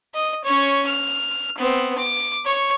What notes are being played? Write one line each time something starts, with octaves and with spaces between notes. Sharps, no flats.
D#5
C#4 C#5
F6
B3 C4
D6
C#5 C#6